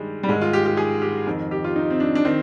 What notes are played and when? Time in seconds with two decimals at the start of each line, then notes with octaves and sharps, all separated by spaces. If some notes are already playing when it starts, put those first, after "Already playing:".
Already playing: G2 D#3 G3 G#3
0.23 G3
0.28 G#2 D#3 G#3
0.41 F4
0.53 G4
0.66 G4
0.77 G#4
1.02 G4
1.27 F2 D#3
1.51 G4
1.64 F4
1.76 D#4
1.91 C4
2.00 D4
2.15 D4
2.25 D#3 C4